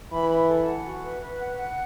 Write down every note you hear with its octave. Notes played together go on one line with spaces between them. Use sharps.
E3 B5
B5
A4
F#5
F#4
B4
B4
F#5
F#5